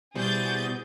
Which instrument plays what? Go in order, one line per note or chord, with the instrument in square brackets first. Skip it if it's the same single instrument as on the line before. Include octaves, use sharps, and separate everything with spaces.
[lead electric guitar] B2 [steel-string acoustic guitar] G3 E4 C5 [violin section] G#4 G6 A6